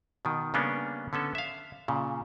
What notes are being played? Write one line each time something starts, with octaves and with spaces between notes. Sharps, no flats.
B2 D#3
C#3 G3 A#3 B3 C#4 D4
D3 B3 C#4 A4
E5 F5
A#2 C#3